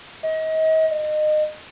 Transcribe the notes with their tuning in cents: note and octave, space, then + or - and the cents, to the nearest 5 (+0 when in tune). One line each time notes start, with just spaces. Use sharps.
D#5 +35
D#5 -30